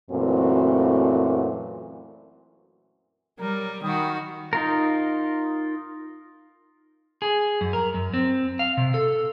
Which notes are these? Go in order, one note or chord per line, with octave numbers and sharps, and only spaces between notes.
F#2 A#2 E3 A3 C4 F#4
F#3 G3 A#4
D#3 F#4 G5 B5 D#6
D#4 F4 A#4
G#4
F#2
A#4
F#2
C4
F5
C3
A4